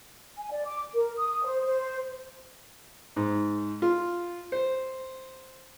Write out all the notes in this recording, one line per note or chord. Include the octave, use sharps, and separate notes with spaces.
G#5
D5
D6
A#4
D#6
C5
C5
G#2
F4
C5